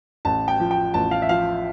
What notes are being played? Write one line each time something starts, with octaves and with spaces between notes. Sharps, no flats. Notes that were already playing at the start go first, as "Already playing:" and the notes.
A1 A5
G5
F3
G5
A1 A5
F5
E5
F3 F5